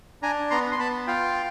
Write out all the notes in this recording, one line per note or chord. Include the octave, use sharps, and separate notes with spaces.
D4 G#5 A#5
B3 A#5 C6
C6
B3 A5 B5
F4 F5 G5